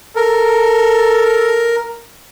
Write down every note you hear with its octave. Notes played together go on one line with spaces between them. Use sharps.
A4 A#4